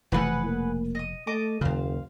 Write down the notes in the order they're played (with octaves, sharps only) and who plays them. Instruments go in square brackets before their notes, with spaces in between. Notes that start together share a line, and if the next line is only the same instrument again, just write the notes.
[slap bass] F1 B2 A3 [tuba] E3 [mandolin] G#4 B4 F#5
[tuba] A#3
[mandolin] D#5 D#6
[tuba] A3 [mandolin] D#5 A5 D6
[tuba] F#1 [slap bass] D#2 C#3 [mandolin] C5 F5